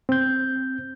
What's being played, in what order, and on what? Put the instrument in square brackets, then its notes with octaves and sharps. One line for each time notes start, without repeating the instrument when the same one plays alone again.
[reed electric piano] C4 G6